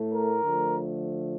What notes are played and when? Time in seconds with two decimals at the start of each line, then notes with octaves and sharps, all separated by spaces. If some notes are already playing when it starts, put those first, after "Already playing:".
Already playing: A2 A3
0.13 A#4
0.43 D3 F3 A3